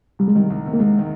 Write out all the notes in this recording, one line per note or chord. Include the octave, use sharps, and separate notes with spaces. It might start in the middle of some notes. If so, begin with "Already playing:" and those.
C2 G3
G#3
C3 D#3 G3
C2
C3 D#3
A#3
C2 G#3
C3 D#3